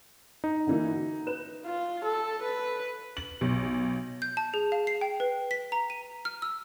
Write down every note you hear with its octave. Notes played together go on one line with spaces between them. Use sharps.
D#4
D3 E3 A#3
F#4
B4 F#6 E7
F4
A4
B4
F#7
B1
G6
A5
G#4
F5
C7
G5
B4
B6
A#5
D#7
F6
E6